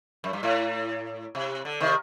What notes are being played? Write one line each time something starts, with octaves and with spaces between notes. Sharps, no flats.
F#2
G2
A2
C3
D3
C3 D#3